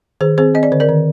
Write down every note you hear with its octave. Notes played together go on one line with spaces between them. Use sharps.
D#3 G#4 C5
C4 G#4 C5
C4 D#5
D5
D3 C5
A#4 D5
D#3